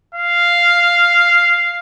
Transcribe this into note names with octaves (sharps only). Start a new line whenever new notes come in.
F5